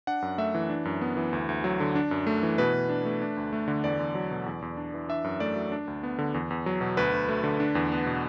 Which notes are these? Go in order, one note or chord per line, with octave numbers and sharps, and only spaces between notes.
D4 F#5
F#2
A3 E5
E3
D4
F#2
B3
E3
D2
D2
F#3
D3
D4
F#2
A3
E3
B2 B4
B2
D4
A3
D4
D2
A3
D3
E2 D5
E2
F#3
B2
E2
E2
D4
E3
D4 E5
F#2
A3 D5
F#3
D4
D2
B3
D3
E2
E2
F#3
B2
D2 B4
D2
A3
D3
D4
E2
B3
B2